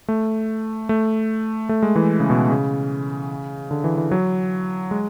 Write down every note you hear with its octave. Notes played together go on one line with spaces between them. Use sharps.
A3
A3
A3
G#3
E3
C#3
B2
C#3
D3
E3
E3
F#3
G#3